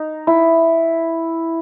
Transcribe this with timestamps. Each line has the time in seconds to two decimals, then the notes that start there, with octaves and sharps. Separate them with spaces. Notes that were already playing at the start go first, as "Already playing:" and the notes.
Already playing: D#4
0.27 E4